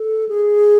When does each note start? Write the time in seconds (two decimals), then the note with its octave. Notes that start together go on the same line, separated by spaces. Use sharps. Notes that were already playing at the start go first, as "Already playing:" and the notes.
Already playing: A4
0.29 G#4